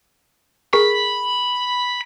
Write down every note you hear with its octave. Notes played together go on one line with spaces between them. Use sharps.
G#4 A#4 B5 C#6